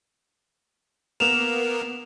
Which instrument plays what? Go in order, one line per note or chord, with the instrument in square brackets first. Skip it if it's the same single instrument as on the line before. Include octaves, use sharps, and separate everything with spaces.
[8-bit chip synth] A#3 B3 A#4 [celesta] E7 F7